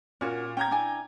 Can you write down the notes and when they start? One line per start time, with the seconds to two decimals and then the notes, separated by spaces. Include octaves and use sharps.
0.21 A#2 C#4 F#4
0.57 C#4 G5 A#5 G#6
0.71 D4 E4 G#5